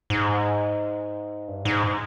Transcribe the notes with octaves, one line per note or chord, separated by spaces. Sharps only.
G#2
G2
G#2